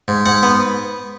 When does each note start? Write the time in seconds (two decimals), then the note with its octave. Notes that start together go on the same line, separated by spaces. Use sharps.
0.08 G#2
0.26 G#2 F#5
0.43 B3